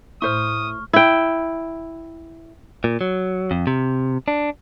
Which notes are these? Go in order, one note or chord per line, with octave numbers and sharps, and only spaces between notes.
A2 E4 C5 C#6 D#6 F6
E4 G5
A#2
F#3
F2
C3
D4